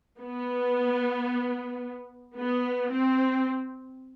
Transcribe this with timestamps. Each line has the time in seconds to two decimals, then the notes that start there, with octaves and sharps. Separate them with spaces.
0.21 B3
2.37 B3
2.91 C4